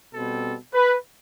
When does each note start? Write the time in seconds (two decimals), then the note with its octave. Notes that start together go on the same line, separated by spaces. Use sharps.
0.13 B2 G3 C4 A4
0.73 B4